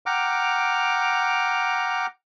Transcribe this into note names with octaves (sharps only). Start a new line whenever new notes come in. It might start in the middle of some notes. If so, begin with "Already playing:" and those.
F#5 G5 A#5 D6 F6